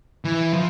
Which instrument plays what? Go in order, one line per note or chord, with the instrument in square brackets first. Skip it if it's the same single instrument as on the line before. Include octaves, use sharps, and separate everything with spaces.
[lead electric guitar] E3
F3